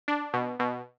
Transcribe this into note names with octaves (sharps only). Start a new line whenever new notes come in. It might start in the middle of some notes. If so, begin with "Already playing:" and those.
D4
B2
B2